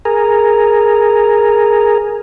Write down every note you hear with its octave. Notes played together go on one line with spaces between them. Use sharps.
G#4 A#4